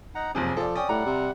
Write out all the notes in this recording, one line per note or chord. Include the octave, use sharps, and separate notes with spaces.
D#4 F#5 A#5
F#1 F2 C3 G#4
F3 A4 D5
C#4 D5 G5 D#6
A2 G3 F#5 A#5
C3